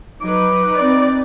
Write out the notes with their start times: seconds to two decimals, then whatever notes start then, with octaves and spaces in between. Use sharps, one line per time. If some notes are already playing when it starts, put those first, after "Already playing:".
0.21 F#3 D#4 B4 D6
0.76 C4 D5